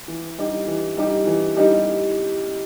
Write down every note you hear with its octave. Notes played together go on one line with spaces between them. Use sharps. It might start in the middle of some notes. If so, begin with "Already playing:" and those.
E3
G3 D#4 G4
E3
G3 D#4 G4
E3
G3 D#4 G4